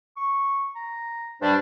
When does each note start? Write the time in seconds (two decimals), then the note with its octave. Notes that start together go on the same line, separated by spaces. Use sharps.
0.17 C#6
0.75 A#5
1.41 G2 G3 D4 C5